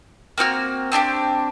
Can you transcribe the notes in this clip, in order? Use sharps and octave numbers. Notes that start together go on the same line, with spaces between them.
A#3 C4 F#4 F6
C4 D4 D#4 G4